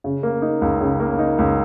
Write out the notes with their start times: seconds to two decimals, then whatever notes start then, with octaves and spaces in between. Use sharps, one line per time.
0.04 C#3
0.23 A#3
0.42 D#4
0.62 C#2
0.81 C#3
1.00 A#3
1.19 D#4
1.38 C#2